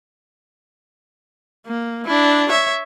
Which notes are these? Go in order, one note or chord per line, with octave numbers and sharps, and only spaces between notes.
A#3
D4 E4
C#5 E5